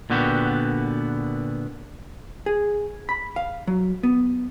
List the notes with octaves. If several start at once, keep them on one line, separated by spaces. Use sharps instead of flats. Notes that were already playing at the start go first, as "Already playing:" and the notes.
A#2 D3 B3 F#4 G4
G#4
B5
F5
F#3
B3